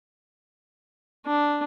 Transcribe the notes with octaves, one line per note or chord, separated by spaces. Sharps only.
D4